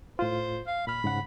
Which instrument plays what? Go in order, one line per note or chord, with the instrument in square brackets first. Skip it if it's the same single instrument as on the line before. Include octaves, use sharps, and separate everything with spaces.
[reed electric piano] A2 F4 [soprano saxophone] C5
[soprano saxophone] F5
[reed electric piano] A#2 F6 [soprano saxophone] B5
[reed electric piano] G#2 C#3 F#5